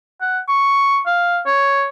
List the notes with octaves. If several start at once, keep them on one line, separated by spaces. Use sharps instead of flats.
F#5
C#6
F5
C#5